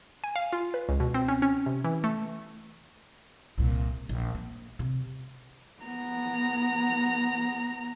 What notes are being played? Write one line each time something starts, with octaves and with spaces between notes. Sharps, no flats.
G#5
F5
F4
B4
C#2
B2
C4
C#4
C#4
C3
E3
A3
C2 A#2
A#1
A#3
C3
B3 A#5